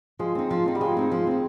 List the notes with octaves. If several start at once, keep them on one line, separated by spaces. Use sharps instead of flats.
F3 G#3
C4 D#4
F3
C4 D#4
G3
F3 G#3
C4 D#4
F3
C4 D#4